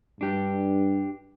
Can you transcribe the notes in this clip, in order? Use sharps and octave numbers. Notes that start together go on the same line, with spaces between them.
G2 D4 G4